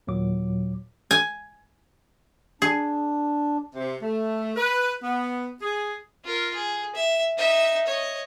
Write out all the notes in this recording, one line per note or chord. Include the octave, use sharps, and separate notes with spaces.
D#2 A#2 F#3 D6
G#5
D4 G#4
C3
A3
B4
B3
G#4
F4 A#4
G#4
E5
D#4 E5
C#5 D#5